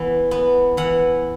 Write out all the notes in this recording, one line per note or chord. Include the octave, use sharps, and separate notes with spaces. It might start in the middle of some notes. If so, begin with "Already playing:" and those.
Already playing: E3 B3
B3
E3 F#5